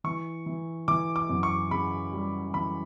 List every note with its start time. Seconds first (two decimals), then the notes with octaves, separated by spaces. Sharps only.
0.04 E3 C#6
0.46 E3
0.88 E3 D6
1.16 D6
1.30 F#2
1.43 C#6
1.71 C#3 B5
2.13 G3
2.54 E3 B5